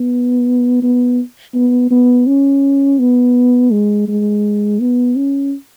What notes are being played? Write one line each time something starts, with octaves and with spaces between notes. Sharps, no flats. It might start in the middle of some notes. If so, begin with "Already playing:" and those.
Already playing: B3
B3
B3
B3
C#4
B3
G#3
G#3
B3
C#4